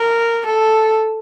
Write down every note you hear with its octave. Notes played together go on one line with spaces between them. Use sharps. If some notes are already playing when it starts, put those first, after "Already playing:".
Already playing: A#4
A4